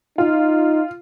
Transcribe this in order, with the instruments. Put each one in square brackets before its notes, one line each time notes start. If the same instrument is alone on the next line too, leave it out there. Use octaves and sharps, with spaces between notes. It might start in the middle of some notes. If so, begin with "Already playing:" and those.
[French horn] D#4 [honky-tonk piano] F4